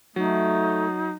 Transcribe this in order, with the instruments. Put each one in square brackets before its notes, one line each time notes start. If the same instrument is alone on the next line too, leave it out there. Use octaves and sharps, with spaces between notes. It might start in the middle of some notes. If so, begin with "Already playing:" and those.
[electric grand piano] F#3 [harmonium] A3 [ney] D#4